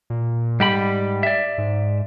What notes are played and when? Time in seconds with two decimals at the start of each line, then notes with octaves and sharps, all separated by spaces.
0.10 A#2
0.60 G#2 G3 G4 B5
1.23 D5 E5
1.58 G#2